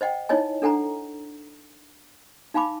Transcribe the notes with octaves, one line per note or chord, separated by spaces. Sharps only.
C5 D#5 F#5 G5
D#4 E4 C#5 D#5 G#5
D4 A4 F#5 G#5 A#5
D#4 F5 G#5 B5 D6